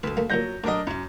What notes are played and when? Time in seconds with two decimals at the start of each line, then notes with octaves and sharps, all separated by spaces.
0.03 D2 A4 B4
0.17 A3 A#3
0.30 D2 G2 A#2 F#3 G6 A#6
0.64 A2 F#3 D4 A#4 D#5
0.87 F#2 C#4 E4